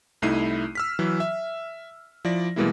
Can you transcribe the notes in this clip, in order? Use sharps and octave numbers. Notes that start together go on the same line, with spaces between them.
C2 A3 D#4 E4 C7 D#7
E6 F6 B6
E3 F#3
E5
F3 E4 D5 A#6
B2 E3 G3 G#3 A#3 E4